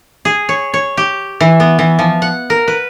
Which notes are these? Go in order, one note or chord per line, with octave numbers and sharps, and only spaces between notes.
G#4
C#5
C#5
G4
E3
B3
E3
F3
F#5
A#4
B4